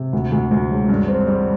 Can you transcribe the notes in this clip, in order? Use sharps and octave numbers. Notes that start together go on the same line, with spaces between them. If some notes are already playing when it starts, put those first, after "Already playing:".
Already playing: C3
D2
D2
D2
E1
G2
C4
G3